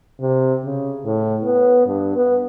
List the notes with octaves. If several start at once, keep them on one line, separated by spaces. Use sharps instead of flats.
C3
C#3
A2
B3
G2
B3